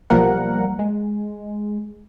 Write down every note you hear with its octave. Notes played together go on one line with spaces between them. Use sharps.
B1 F3 G3 A#3 A#4 F#5
G#3